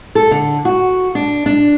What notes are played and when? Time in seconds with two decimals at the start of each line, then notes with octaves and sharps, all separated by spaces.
0.15 A4
0.31 D3
0.65 F#4
1.15 D4
1.46 D4